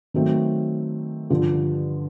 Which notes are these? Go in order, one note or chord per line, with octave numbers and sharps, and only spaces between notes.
D#3 F#3 A3 C4
G2 D3 F3